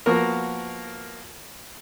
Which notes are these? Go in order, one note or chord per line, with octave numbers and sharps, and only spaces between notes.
F3 A#3 B3 F#4 A#4